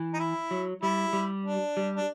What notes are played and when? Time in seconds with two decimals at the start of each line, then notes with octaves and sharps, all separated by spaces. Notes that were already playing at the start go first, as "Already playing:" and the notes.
Already playing: E3
0.14 D#4
0.20 E4
0.51 F#3
0.82 G3 E4
1.13 G3
1.45 D4
1.77 G3
1.96 D4